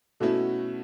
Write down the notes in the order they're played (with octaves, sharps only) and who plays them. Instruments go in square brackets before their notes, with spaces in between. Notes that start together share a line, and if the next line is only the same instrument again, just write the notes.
[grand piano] B2 A3 C#4 E4 [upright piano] F#4 A4